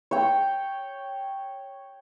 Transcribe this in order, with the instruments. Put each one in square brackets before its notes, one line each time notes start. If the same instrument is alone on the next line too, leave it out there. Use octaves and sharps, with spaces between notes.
[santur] C#5 G5